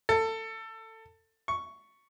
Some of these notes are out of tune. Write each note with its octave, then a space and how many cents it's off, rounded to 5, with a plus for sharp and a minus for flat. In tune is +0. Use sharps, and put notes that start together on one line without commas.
A4 +20
C#6 +5